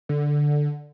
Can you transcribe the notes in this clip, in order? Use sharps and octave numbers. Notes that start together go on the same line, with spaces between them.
D3